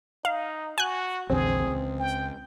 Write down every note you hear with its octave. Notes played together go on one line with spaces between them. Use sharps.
D#4 F5
F#4 G#5 F#6
A#1 E2 D3 C4 G#4
C#2
G5